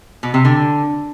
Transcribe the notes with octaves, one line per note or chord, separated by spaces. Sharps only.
B2
C3
D3